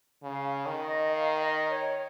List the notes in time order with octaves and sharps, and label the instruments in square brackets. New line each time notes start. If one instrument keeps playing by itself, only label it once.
[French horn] C#3 [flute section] F5
[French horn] D#3
[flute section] D#5
F5
D#5
C#5